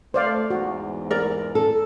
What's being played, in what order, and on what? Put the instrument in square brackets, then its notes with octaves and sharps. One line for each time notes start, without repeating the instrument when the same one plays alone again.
[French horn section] A3 [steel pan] C5 D5 F5
[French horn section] E2 G#2 [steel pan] F#4
[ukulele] A#4 D5
[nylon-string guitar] A4